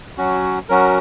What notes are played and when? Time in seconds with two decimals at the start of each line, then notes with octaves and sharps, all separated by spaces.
0.18 F#3 C#4 F#4
0.69 F#3 C#4 F#4 A#4